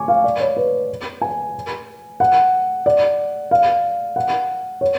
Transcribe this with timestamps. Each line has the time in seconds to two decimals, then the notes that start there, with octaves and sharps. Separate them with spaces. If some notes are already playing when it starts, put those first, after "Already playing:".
Already playing: G#5 C#6 D6
0.08 F5
0.24 D5
0.40 C#5
0.57 B4
1.22 G#5
2.20 F#5
2.86 D5
3.51 F5
4.16 F#5
4.81 C#5